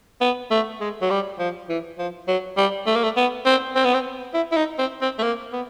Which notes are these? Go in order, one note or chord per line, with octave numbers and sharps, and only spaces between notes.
B3
A3
G#3
F#3
G3
F3
E3
F3
F#3
G3
A3
A#3
A3
B3
C4
C4
B3
C4
E4
E4
D#4
C4
C4
A3
A#3
B3